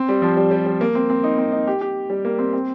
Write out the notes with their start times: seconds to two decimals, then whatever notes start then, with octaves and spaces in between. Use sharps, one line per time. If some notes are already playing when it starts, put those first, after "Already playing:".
Already playing: C4
0.09 G3
0.22 F3
0.37 G3
0.51 G3
0.66 G3
0.81 A#3
0.95 C4
1.10 C4
1.24 D#4
1.38 C4
1.52 D#4
1.67 G4
1.81 G4
2.10 G3
2.25 A#3
2.38 C4
2.53 C4